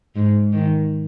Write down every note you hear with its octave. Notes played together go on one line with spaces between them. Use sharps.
G#2
D#3